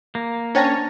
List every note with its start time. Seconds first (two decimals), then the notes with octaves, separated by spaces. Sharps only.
0.15 A#3
0.55 C#4 D4 C5 C#5 G5 A5 A6 A#6